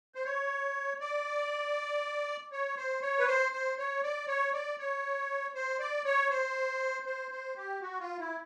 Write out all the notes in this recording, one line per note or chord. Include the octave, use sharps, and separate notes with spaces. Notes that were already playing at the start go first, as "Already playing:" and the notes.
C5
C#5
D5
C#5
C5
C#5
B4
C5
C5
C#5
D5
C#5
D5
C#5
C5
D5
C#5
C5
C5
C5
G4
F#4
F4
E4